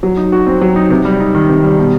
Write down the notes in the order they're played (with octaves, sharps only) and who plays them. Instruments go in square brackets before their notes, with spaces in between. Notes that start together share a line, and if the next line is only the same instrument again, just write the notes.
[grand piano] F#3
D#4
F#4
C4
F#3
D#4
C3
G3
D#4
D#3
C3
G3
B2